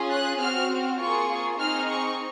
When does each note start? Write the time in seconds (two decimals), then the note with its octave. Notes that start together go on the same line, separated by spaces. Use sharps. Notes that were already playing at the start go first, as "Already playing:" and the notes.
Already playing: C#4 F4 G#4
0.12 F#6
0.40 C4 F#4 F6
0.99 A#3 F4 G#4 C#6
1.59 C4 D#4 G#4 F6
1.89 C#6